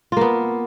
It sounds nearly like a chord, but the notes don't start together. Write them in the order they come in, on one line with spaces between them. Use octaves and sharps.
F4 A#3 B3